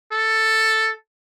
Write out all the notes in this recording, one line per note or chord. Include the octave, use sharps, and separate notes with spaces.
A4